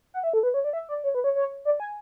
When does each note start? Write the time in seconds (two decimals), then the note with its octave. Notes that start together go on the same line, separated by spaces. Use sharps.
0.14 F#5
0.24 E5
0.33 A4
0.43 B4
0.54 C#5
0.64 D5
0.73 E5
0.89 D5
1.04 C#5
1.15 B4
1.24 C#5
1.35 C#5
1.65 D5
1.80 G#5